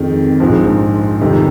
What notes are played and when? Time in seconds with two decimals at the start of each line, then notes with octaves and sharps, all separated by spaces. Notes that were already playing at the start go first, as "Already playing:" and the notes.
Already playing: F2 D#3 G#3
0.40 A#1 G#2 F3
1.21 F2 C3 D#3 G3